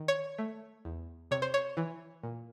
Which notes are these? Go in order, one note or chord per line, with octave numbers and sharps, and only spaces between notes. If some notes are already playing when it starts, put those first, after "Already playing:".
Already playing: D#3
C#5
A3
E2
C3 C#5
C5
C#5
E3
A#2